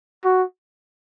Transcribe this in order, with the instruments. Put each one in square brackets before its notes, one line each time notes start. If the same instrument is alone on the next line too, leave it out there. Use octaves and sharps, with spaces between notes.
[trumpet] F#4